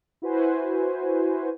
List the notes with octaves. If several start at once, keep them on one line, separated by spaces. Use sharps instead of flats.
E4 F#4 B4 C5 G#5